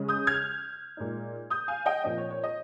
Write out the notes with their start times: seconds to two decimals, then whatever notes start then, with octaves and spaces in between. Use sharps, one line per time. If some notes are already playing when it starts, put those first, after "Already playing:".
Already playing: C#3 G#3 C#4
0.09 D#6 G6
0.27 F6 G#6
0.97 A#2 G#3 D#4
1.50 D#6 G6
1.68 F5 G#5
1.86 D#5 G5
2.04 A#2 F3 C4 D#5
2.18 C#5
2.30 C#5
2.44 D#5